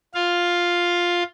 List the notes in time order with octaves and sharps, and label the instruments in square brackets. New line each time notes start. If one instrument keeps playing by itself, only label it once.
[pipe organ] F4 F5